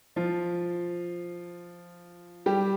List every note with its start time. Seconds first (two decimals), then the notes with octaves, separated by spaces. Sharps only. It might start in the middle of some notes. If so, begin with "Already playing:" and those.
0.16 F3 F4
2.46 G3 G4